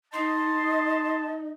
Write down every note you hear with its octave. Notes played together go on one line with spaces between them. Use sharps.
D#4 D#5 A5 C6